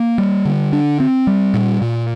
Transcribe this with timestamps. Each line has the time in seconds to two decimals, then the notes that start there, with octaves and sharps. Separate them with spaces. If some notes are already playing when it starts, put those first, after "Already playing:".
Already playing: A#3
0.18 G3
0.45 D3
0.73 D4
1.00 C4
1.27 G3
1.54 A#2
1.82 A#2